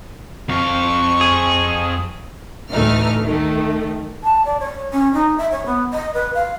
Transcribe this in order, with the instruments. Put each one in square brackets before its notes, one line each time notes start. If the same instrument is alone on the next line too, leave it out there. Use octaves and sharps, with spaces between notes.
[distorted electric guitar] F2 F5 [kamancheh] C#6
[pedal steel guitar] G#4
[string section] D2 A2 E3 A3 D#4 F6
D#3 A3
[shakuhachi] A5
D5
C#5
C#4
D#4
E5
C#5
B3
D#5
B4
F5